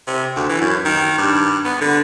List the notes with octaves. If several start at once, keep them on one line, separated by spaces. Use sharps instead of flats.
C3
D2
E3
F#2
D#3
G2
B3
D3